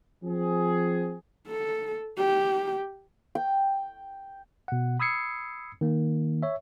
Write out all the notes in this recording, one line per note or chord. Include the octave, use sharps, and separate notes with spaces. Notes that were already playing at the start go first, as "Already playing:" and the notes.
F3 C4 G#4
A4
G4
G5
B2 F#5
B5 D#6 E6 G#6 C7 C#7
D#3 A#3
C#5 E5